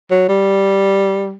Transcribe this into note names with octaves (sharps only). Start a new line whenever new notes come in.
F#3
G3